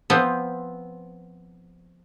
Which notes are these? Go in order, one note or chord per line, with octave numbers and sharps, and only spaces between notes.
F3 B3 C4